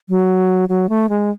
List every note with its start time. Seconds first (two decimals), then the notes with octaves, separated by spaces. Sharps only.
0.09 F#3
0.69 F#3
0.89 A3
1.09 G#3